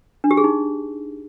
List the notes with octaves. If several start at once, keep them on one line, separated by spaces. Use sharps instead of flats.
D4
G4
G#4
D#4